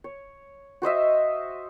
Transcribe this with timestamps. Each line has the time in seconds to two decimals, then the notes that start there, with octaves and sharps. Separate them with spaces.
0.04 C#5
0.82 F#4 C5 D#5 E5